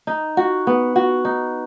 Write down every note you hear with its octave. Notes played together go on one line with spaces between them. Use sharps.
D#4
F#4
B3
F#4
D#4